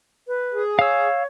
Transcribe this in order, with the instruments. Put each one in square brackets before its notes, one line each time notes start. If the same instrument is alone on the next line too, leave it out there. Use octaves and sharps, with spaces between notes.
[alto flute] B4
[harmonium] G#4
[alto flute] C#5 [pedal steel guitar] F5 E6